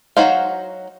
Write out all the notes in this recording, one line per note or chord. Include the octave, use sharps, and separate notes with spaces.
F#3 D#4 F#4 C5 F5